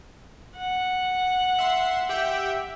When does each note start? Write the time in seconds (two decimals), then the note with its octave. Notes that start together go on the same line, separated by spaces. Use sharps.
0.57 F#5
1.59 E5 C6
2.09 G4 E5 G5